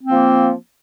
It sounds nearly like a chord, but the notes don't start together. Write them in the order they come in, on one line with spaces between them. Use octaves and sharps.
C4 A#3 F3